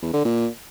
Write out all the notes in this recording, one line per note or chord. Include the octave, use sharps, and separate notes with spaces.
E2
D3
A#2